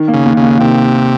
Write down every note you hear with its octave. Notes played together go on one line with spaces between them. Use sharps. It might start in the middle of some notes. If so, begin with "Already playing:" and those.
Already playing: D#3
A#3
C#3
D#2
C#3
D#2
C3 D#3